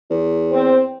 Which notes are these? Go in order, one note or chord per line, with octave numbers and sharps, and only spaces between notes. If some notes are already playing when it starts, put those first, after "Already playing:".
E2
C4 C5